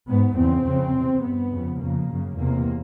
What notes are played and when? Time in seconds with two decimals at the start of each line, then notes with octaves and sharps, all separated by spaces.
0.09 G#2 B3
0.37 E2 C#3 C4
0.66 F2 C#3
0.94 E2 C3
1.23 G2 B3
1.51 F2 C#3
1.80 F2 C#3 A#3
2.09 F#2 C#3
2.37 E2 C3 A#3